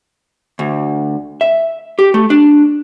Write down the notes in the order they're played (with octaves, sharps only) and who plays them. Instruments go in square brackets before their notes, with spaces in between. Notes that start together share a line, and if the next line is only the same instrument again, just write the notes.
[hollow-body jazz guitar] D2
E5
G4
A3
D4